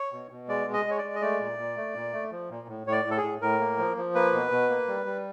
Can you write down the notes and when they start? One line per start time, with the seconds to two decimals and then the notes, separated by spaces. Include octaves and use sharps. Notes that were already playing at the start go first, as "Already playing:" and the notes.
Already playing: C#5
0.12 B2
0.31 B2
0.48 G#3 D5
0.67 G#3
0.73 D#5
0.86 G#3 C#5
0.98 D5
1.03 G#3
1.15 D#5
1.22 A3 D5
1.40 A#2
1.58 A#2
1.76 A3
1.95 A#2
2.13 A3
2.32 F3
2.50 A#2
2.68 A2
2.87 A2 C#5
2.92 D5
3.05 A2
3.11 A4
3.17 G#4
3.23 A2
3.41 A2 A#4
3.60 A#3
3.78 F3
3.97 F3
4.15 A#3 B4
4.33 B2
4.51 B2
4.70 A#3
4.88 G3
5.06 G3